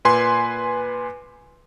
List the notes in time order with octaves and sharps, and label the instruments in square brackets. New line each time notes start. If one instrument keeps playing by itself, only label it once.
[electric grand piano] A#2 B4 G#5 C6